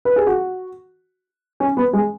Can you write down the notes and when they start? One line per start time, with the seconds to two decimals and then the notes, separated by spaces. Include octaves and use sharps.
0.05 B4
0.16 G#4
0.27 F#4
1.60 C#4
1.77 B3
1.93 G#3